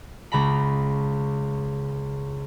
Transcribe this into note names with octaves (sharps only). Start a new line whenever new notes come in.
C#2 C#3 A#5 B5